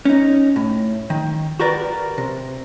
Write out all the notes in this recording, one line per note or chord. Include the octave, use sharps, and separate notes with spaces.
C#4 D#4
A2
D#3
F#4 G4 A#4 B4 D5
C3